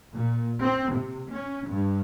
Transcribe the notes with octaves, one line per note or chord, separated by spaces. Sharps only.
A#2
C4
C3
C#4
G2